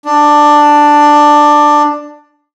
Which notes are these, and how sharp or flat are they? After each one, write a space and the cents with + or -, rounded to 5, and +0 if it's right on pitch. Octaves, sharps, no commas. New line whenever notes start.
D4 +10